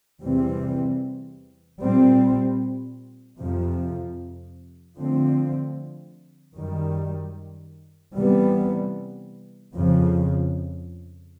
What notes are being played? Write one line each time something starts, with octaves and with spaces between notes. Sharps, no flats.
E2 C3 E3 G3 C4
A#2 G3 C4
F2 C3 F3
D3 F3 A3 C4
F#2 D#3 G3
C3 E3 G3 B3
F2 C#3 F3